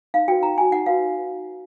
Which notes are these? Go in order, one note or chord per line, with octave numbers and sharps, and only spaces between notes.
D#4 F5
F#4 B4 G5
D#4 A#5
F#4 B4 G#5
D#4 F#5
F#4 B4 F5